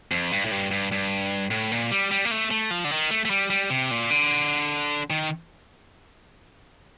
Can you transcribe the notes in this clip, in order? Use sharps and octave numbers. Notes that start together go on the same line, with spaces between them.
F2
G2
A2
G2
G2
G2
A2
A#2
G3
G3
A#3
A3
A3
F3
D3
D#3
A3
A3
G3
G3
C3
A#2
D3
D#3